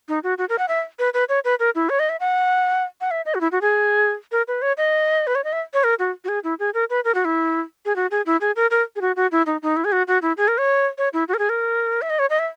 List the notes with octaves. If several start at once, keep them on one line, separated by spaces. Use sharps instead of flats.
D#4
F#4
F#4
A#4
F#5
E5
B4
B4
C#5
B4
A#4
E4
C#5
D#5
E5
F#5
F#5
E5
D#5
F#4
E4
F#4
G#4
A#4
B4
C#5
D#5
B4
C#5
D#5
E5
C#5
A#4
F#4
F#4
G#4
E4
G#4
A#4
B4
A#4
F#4
E4
G#4
F#4
G#4
E4
G#4
A#4
A#4
G#4
F#4
F#4
E4
D#4
D#4
E4
G#4
F#4
F#4
E4
G#4
A#4
C#5
C#5
E4
F#4
A#4
G#4
A#4
E5
D#5
C#5
D#5
E5